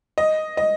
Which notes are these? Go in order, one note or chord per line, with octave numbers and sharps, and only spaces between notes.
D#5
D#5